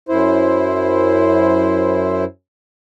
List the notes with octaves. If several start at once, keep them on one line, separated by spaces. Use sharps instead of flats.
F#2 E4 C5